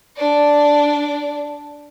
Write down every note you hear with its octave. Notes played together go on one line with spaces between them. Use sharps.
D4 D5